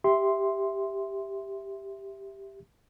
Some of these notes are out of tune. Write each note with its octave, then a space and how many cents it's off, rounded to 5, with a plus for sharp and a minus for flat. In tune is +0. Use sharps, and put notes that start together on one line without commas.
G4 +0 E5 +0 C6 +0